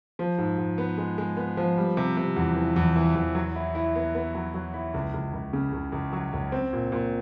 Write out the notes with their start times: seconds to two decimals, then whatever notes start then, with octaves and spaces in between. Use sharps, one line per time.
0.19 F3
0.38 G#2
0.58 G#2
0.78 B3
0.98 G#3
1.18 G#3
1.37 B3
1.57 F3
1.77 G3
1.97 C3
2.17 C3
2.36 E2
2.56 E3
2.76 E2
2.96 E3
3.15 E2
3.35 F#3
3.56 E4
3.75 E4
3.95 B3
4.15 B3
4.35 F#3
4.54 F#3
4.74 E4
4.94 C#2
5.14 C#2
5.34 C#2
5.53 C#3
5.73 C#2
5.92 C#2
6.13 F#3
6.33 C#2
6.52 C4
6.73 A#2
6.92 A#2